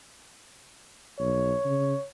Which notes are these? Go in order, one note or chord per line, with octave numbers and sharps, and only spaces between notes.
B1 C#5
C#3